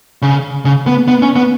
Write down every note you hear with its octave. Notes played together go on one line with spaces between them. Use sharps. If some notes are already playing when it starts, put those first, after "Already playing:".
C#3
C#3
B3
B3
C#4
B3